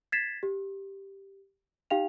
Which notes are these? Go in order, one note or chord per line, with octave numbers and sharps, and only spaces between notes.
G#6 A6 B6 C7 E7
G4
D#4 G4 F5 G5 F7